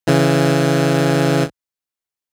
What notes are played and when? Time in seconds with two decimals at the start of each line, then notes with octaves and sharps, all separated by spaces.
0.07 C#3 E3